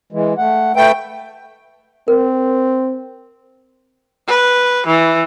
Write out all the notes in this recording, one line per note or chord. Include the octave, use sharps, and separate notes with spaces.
E3 G#3
A3 F#5
A3 B4 G5
C4 A#4
B4
E3